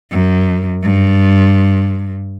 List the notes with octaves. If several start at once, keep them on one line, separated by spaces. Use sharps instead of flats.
F#2
G2